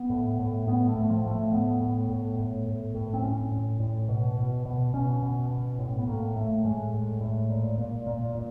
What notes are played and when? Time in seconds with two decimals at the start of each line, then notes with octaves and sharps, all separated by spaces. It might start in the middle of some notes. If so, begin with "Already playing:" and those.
Already playing: B3
0.10 A2
0.39 A2
0.67 A2 B3
0.88 A3
0.96 A2
1.10 F3
1.24 A2
1.31 A3
1.52 A2 B3
1.81 A2
2.09 A2
2.38 A2
2.67 A2
2.94 A2
3.13 C4
3.23 A2 C#4
3.52 A2
3.80 A2
4.09 B2
4.37 B2
4.65 B2
4.93 B2 C#4
5.23 B2
5.51 B2
5.79 A2
5.98 B3
6.07 A2 A#3
6.36 A2 A3
6.64 A2 G#3
6.93 A2
7.21 A2
7.50 A#2
7.78 A#2
8.07 A#2
8.35 A#2